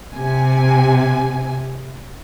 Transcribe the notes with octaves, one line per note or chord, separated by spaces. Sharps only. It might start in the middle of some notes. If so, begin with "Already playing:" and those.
C3 G#5